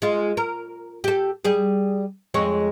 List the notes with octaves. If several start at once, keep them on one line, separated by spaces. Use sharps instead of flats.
G#3 F4
A#4
G4 A4
G3 G#4
F2 G#3 C#5